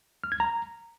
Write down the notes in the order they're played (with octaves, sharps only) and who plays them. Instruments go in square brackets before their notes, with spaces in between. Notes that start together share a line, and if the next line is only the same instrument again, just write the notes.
[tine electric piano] F6
G#6
A#5